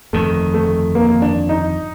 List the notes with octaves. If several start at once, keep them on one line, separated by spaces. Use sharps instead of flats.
G1 F2 D#3 A3
A3
A#3
D4
D#4